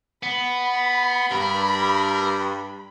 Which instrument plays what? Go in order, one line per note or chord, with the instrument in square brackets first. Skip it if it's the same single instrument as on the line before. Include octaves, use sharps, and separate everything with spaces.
[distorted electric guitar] B3 [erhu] B5
[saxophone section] G2 [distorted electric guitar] A#4